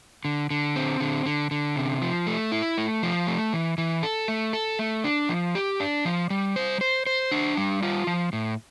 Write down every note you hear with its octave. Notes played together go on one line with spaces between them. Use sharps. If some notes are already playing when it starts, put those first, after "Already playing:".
D3
D3
C4
D3
D3
D3
C3
F3
A3
E4
A3
F3
A3
E3
E3
A4
A3
A4
A3
D4
F3
G4
D4
F3
G3
C5
C5
C5
D4
G3
F4
F3
A2